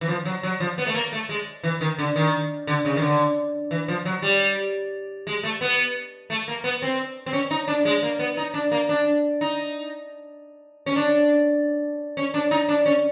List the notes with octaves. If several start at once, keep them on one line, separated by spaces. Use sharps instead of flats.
E3
F3
F#3
F#3
F3
B3
A3
A#3
A3
G#3
E3
D#3
D3
D#3
D3
C#3
D#3
D3
E3
F3
F#3
G3
G#3
A3
B3
A3
A#3
B3
C4
C4
C#4
D#4
D4
G#3
A#3
B3
D#4
D4
A#3
D4
D#4
C#4
D4
C#4
D4
D#4
D4
C#4